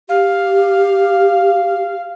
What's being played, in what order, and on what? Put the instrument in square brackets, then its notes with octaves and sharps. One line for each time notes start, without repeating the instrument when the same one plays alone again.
[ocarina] G4 [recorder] F5